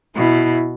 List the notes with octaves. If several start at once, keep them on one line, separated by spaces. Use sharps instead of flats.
B2 E4